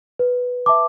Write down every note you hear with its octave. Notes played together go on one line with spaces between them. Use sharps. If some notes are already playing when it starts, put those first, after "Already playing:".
B4
E5 A5 D6